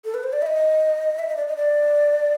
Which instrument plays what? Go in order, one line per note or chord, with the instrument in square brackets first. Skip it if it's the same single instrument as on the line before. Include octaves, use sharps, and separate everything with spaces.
[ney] A4
B4
C5
D5
E5
D#5
E5
D#5
D5
D#5
D5